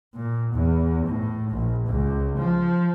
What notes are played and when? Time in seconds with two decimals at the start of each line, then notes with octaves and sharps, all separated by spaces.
0.14 A#2
0.54 E2
1.07 A2
1.50 A#1
1.88 C#2
2.37 F3